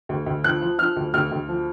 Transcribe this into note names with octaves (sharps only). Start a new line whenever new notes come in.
D2
D2
F3 F#6
F3
F3 F6
D2
D2 F6
D2
F3